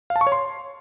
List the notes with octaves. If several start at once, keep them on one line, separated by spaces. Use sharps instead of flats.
F5
A5
C#6
C#5
C6